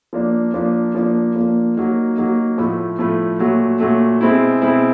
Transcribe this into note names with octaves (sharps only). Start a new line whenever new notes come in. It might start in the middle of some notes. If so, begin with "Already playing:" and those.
F3 A#3 D4
F3 A#3 D4
F3 A#3 D4
F3 A#3 D4
F#3 A#3 D#4
F#3 A#3 D#4
A2 F3 A3
A2 F3 A3
A#2 F#3 A3
A#2 F#3 A3
B2 G#3 C4 E4
B2 G#3 C4 E4